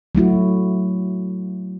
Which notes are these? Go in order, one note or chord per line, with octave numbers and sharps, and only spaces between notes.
F#3 A3 E4 F#4